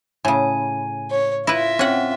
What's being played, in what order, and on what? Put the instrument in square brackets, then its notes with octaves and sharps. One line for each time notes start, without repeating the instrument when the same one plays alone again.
[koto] A2 C#3 [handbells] G#5
[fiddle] C#5
[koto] E4 B4 [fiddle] F4 E5 [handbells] A#6
[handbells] C4 [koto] C#4 F#5